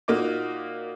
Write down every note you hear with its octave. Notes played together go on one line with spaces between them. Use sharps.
A#2 A#3 D#4 F#4 D6